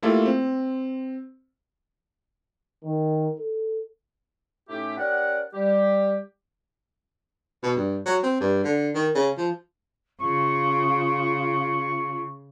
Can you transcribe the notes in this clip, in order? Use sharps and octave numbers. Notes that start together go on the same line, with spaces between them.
A3 A#3 E4 F4 G4 A4
C4
D#3
A4
A2 A3 C#4 D#4 E4 G4
C#4 G4 A#4 D5 F#5
G3 G4
B2
G2
F#3
C4
G2
D3
D#3
C#3
F3
C#3 F4 C#6